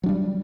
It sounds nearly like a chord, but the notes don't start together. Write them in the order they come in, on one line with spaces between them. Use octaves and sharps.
F#3 D4 G3